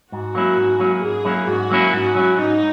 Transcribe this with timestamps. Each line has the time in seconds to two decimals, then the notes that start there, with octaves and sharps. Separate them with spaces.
0.12 G#2 F#4
0.35 F#3 A#3 C#4 E4
0.57 G#2
0.80 F#3 A#3 C#4 E4
1.03 G#2 G#4
1.25 F#3 A#3 C#4 E4
1.47 G#2 F#4
1.70 F#3 A#3 C#4 E4
1.93 G#2
2.15 F#3 C#4 E4
2.38 G#2 D#4